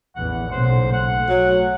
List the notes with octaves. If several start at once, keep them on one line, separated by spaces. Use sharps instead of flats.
A1 E2 E3 F#5
B1 A#2 C#3 C5
A3 F#5
F#3